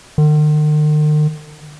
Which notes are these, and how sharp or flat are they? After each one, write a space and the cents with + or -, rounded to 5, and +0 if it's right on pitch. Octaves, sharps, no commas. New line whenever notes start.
D#3 -45